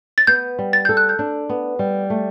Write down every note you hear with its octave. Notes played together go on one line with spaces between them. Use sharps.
A6
B3 G6
G3
A6
A4 G6
F#6
G6
D4
B3
G3
A3